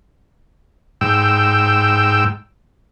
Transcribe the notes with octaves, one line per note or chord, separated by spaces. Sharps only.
G#2 G5 E6